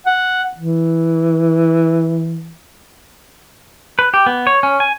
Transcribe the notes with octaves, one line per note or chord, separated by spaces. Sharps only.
F#5
E3
B4
G4
B3
C#5
C#4
G#5